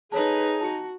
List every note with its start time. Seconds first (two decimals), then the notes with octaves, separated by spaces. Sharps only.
0.12 D#4 G#4 A4 B4 C#5 G#5 A5
0.61 F#4 A5 C#7